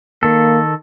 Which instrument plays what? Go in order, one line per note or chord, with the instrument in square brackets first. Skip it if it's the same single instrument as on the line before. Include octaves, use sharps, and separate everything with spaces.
[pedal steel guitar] D#3 A4 [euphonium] A#3